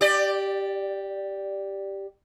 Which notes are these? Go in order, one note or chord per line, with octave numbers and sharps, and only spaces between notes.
G4 D5